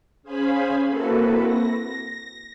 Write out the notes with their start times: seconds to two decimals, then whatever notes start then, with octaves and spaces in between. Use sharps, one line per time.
0.23 C#4 G#4 C5 F5 G#5 B5
0.87 A#3 C4 E4 F#4 A4 B4
1.45 A#6